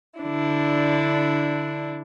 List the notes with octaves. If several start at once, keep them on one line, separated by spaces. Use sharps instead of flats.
D3 D4 E4